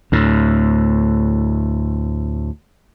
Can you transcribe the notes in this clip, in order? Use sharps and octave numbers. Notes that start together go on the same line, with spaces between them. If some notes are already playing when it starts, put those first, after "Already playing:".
D2 A2